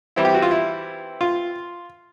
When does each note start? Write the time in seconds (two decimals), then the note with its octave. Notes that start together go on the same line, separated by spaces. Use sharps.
0.16 E3 G3 C4 E4
0.25 G4
0.34 F#4
0.42 F4
0.51 E4
1.21 F4